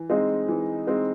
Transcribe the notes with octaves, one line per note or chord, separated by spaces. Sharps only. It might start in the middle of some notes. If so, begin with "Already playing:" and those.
Already playing: E3
G#3 C4 D#4
E3
G#3 C4 D#4